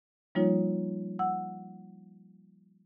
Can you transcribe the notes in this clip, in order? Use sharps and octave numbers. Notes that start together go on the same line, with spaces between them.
F3 G3 A#3 D#4 F4 C#5
F#5 E6